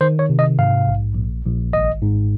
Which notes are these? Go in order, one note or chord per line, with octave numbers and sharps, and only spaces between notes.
D#3 C5
C#5
C3
D#5
G#2 F5
A#1
A#1
A#1
G#1 D#5
G#2